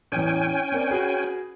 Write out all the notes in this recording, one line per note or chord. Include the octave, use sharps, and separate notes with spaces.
A1 E2 C#4 G5 G#5
C4 A#4 D5
F#4 G#4 B4